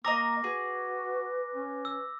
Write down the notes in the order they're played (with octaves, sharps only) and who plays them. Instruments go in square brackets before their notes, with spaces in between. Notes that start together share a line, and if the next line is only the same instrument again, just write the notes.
[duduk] A#3 [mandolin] D#5 A#5 D#6 [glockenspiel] D6 A#6
[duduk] F#4 [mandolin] G#4 [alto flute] B4
[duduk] C#4
[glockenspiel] E6